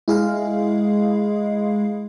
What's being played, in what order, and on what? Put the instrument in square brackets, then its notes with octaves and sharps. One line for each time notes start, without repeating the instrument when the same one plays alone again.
[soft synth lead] G#3 [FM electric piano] E4 G#4 F5